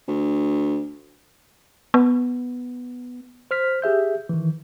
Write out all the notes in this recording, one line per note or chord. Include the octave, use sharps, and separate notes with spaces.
D2
B3
C5 F6 B6
G4 G#4 E5 G6
D#3 E3